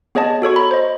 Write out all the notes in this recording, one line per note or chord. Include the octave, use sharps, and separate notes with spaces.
B3 G#4 C#5 D#5 A5
F#4 A4 C#5 C#6
A#5 B5
C5 D#5